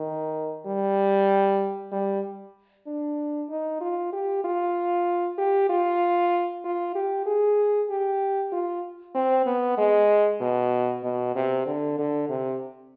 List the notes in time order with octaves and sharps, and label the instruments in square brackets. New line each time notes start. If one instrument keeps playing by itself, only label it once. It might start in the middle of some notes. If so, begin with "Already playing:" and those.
Already playing: [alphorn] D#3
G3
G3
D4
D#4
F4
G4
F4
G4
F4
F4
G4
G#4
G4
F4
C4
B3
G#3
B2
B2
C3
D3
D3
C3